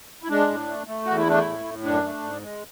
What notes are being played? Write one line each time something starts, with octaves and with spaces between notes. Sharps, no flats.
E4
G#3 D4
A2
A3
A3
E2 F#4
E4
A3 D4
E4
A2
A2
F#2 D4
A3
G#2
G#3